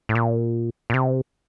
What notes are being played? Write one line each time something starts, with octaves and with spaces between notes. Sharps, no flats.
A2
A#2
A#2
C3